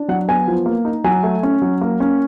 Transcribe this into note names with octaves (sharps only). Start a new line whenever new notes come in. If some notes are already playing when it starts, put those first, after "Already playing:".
Already playing: D4
F#3 F#5
B3 G#5
F3
A#3
D#4
F#3 G#5
A3
C#4
F#3
A#3
C#4